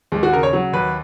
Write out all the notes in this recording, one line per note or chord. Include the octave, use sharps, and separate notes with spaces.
D#2 G#3
F#4
C#3 A#4
C#5
F#3
D#2 B4